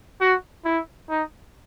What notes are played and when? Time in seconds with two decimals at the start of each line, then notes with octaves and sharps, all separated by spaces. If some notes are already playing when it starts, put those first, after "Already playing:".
0.21 F#4
0.65 E4
1.10 D#4